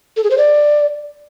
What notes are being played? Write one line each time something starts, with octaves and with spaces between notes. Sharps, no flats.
A4
G#4
C5
D5